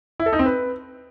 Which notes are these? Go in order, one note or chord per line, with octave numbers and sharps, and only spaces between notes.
E4
A4
D#4
C4
B4